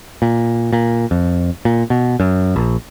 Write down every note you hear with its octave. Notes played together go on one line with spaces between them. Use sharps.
A#2
A#2
F2
A#2
B2
F#2
A#1